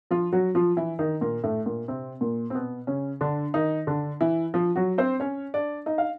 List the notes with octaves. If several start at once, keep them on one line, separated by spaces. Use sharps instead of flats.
F3 F4
F#3 F#4
F3 F4
E3 E4
D#3 D#4
A#2 A#3
A2 A3
A#2 A#3
C3 C4
A#2 A#3
C4
B2 B3
C#3 C#4
D3 D4
D#3 D#4
D3 D4
E3 E4
F3 F4
F#3 F#4
C4 C5
C#4 C#5
D4 D5
D#4 D#5
F5